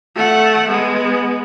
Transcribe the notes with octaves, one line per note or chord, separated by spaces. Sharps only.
A3 F#5
G#3 B3